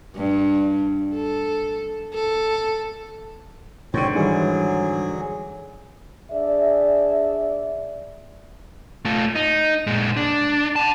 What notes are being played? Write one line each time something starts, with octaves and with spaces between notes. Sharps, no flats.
G2
A4
A4
G#2 D3 C4 C#5 G5
D#3 E3 F#3 G3 G#4
D4 G#4 D5 E5
A3 F4
D#4
A#2 G#3
D4
F#5 A5